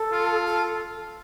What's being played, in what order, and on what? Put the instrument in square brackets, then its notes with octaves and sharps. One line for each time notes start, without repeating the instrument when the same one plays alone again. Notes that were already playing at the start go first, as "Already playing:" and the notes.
Already playing: [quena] A4
[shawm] F4
[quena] A4